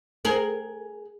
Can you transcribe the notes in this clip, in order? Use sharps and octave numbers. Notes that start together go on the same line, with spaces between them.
G#4 A#4